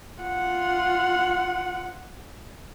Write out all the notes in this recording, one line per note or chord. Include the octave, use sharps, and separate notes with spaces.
F4 F#5